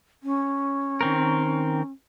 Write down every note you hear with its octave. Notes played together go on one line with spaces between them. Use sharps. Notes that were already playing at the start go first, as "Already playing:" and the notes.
C#4
D#3 C4 A#4